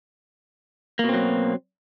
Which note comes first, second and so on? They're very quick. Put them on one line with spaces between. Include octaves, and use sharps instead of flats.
A#3 B2 C4 F#3